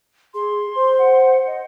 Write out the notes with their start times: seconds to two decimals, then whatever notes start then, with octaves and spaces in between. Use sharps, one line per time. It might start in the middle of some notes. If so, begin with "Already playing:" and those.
0.34 G#4 C6
0.75 C5
0.99 F#5
1.47 D#5